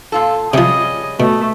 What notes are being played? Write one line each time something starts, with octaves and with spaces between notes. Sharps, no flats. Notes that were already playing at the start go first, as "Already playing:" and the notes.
A#2 F4 A4
C3 F3 G3 C#4 G#4 D#5
B2 A3